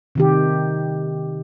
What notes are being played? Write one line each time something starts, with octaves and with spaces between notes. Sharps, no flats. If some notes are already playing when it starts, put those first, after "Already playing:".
C3 D#3 G4